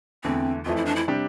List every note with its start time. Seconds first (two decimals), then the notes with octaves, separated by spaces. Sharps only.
0.24 E2 D3 A3 C4 E4
0.65 F2 E3 A3 F4
0.76 E4
0.85 D4
0.96 E4
1.08 C3 G3 D4 G4